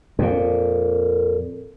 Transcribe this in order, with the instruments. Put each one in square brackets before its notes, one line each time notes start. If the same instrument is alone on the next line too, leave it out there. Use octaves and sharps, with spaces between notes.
[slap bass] F2 A#2